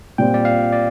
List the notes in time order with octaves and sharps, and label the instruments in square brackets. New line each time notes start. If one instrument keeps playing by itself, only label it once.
[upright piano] A#2 G3 C4 F4 [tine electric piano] G5
[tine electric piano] D5
F5
D5